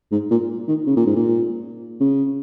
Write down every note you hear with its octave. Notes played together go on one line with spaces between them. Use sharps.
G#2
A#2
D#3
C#3
A#2
G#2
A#2
C#3